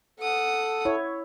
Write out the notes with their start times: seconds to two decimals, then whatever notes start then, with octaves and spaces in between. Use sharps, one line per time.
0.20 A4 F#5 D#6
0.85 E4 C#5